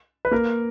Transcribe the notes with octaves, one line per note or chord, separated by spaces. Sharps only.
B4
A#3 A#4